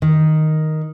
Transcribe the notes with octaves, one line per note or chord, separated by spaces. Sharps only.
D#3